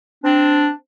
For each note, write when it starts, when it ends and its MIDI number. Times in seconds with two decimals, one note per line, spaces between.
0.24 0.71 60
0.24 0.71 62